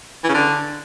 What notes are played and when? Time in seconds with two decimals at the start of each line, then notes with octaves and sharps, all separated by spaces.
0.24 E3
0.29 C#3
0.34 D3